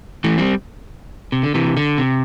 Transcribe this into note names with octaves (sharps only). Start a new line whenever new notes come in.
E3 A3
G3 C4
C3
D3
C3 E3
D3
C3